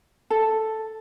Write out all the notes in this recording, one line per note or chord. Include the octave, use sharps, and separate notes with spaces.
A4